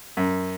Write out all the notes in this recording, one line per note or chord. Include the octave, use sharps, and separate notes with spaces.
F#2